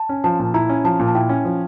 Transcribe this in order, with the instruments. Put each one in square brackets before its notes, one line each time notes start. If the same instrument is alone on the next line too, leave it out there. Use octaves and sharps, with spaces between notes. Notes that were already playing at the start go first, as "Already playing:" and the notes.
Already playing: [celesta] A5
[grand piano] C#4
[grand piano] F3 [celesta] A5
[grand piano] A#2
[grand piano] E4 [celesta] A#5
[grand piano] C#4
[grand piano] F3 [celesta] A5
[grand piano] A#2
[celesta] A5
[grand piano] E4 [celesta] G5
[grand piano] C#4
F3